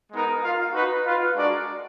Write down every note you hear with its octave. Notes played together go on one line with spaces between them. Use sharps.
G#3 B3 D#4 A#4
F4 A#4 F5
D#4 F#4 B4
F4 B4 F5
G#3 D4 F#4 A#4 D5